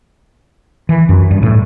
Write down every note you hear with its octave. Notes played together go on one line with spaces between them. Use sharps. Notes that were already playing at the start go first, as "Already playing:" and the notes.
E3
F#2
G2
A2